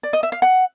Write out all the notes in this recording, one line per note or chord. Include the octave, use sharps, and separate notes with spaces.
D5
D#5
E5
F5
F#5